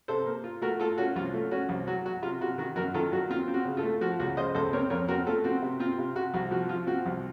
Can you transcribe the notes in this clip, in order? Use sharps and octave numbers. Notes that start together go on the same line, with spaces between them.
C3 A4 C5
A#3
F4
A3 F#4 A#4
F4 A4
C#4 F#4
C2 F4
A3
C#4 F#4
C2
F#3 F#4
F#3 F#4
C3 F4
C3 F#4
D#3 F#4
F#2 F#4 A#4
D#3 F4 A4
F#3 F#4
C4 F4
C4
F#4
C#3
F4 A4
A3
F3 F#4
C#2 F#4
C#3 C5 D#5
C#2 A4 C5
C4 A#4 C#5
F2 A#4 C#5
C4 F#4 A#4
A3 F4 A4
C4 F#4
C3
C4 F4
C3
C3 F#4
C2 F#4
F3 F#4
F3 F4
C4 F#4
C2